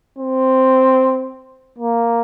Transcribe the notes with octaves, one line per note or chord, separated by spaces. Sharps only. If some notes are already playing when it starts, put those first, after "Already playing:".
C4
A#3